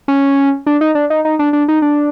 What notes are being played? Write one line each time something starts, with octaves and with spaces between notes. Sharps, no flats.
C#4
D4
D#4
D4
D#4
D#4
D4
D4
D#4
D4